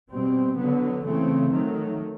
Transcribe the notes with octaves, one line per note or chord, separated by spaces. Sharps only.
B2 G3 C4
D3 F#3 B3
C#3 E3 A3 C4
D#3 F#3 A3